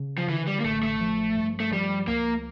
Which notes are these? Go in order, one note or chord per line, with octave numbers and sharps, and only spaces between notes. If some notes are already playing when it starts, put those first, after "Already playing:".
Already playing: C#3
F3
D3 E3
G3
A#3
A1 A3
A3
F3
G2
A3
F3 G3
C#2 A#3